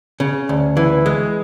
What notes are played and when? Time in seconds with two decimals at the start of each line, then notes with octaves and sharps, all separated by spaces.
0.20 C#3
0.49 D2
0.77 E3
1.06 G#3